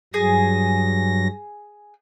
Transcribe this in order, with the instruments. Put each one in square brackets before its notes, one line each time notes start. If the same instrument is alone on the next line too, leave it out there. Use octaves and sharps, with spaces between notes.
[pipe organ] G2 F#3 A#6 [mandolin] G#4